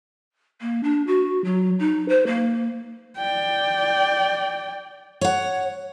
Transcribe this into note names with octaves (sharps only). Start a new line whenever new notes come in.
A#3
D4
F#4
F#3
D#4
C5
A#3
D5 G5
C#5 F#5